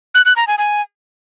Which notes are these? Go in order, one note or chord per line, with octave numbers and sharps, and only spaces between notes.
F#6
F#6
A#5
G#5
G#5